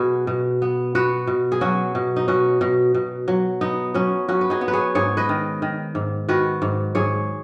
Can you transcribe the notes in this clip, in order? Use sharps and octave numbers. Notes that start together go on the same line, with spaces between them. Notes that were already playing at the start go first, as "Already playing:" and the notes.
Already playing: B2 F#4 G#4 B4
B2
B3
B3 F#4 B4
B2
G#4
F#3 C#4 F#4
B2
D#4
B2 C#4 F#4
B2
B2
F#3
B3 D#4
F#3 C#4
F#3 C#4 F#4
B4
D#4 G#4
B3
B4
G#4 C#5
G#2 G#4 C#5
B4 D#5
D#3
D#3
G#2
D#3 F#4 B4
G#2
G#2 G#4 C#5